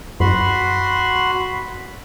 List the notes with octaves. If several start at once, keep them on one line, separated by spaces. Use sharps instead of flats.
F#2 F#4 B5 C6